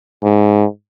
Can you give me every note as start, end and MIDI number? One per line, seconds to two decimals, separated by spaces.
0.23 0.65 44